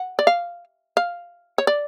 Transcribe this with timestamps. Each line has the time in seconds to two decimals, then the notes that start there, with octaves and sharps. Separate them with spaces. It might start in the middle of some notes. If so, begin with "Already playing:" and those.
Already playing: F#5
0.19 D5
0.27 F5
0.97 F5
1.58 C#5
1.67 D5